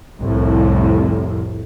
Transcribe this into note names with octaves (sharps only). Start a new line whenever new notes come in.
C2 F2 A2